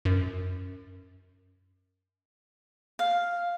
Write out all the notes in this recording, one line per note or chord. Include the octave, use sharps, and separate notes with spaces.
F#2
F5